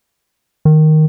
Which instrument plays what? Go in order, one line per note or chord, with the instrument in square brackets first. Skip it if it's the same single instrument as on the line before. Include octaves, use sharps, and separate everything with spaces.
[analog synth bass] D#3